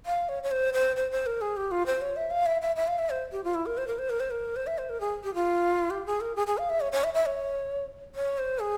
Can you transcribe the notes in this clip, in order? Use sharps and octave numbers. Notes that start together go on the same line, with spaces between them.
F5
C#5
C#5
C5
C5
C5
C5
A#4
G#4
G4
F4
C5
C#5
E5
F5
E5
E5
E5
F5
E5
C5
G4
F4
E4
A#4
C5
A#4
C5
A#4
C5
A#4
C5
E5
C5
A#4
G#4
G4
F4
G4
G#4
A#4
G#4
G#4
F5
E5
C#5
C#5
E5
E5
C#5
C#5
C5
G#4